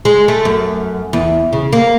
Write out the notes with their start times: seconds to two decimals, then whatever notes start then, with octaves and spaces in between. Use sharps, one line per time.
0.05 G#3
0.28 A3
0.45 F#2
1.13 E2
1.53 C#3
1.73 A#3